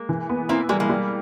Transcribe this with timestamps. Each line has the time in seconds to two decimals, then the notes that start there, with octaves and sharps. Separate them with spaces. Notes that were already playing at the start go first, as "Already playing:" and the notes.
Already playing: G#3 A#3
0.09 E3
0.29 B3
0.49 A#3 C4 E4
0.69 G3 G#3 A#3
0.80 G#3 A#3
0.89 G3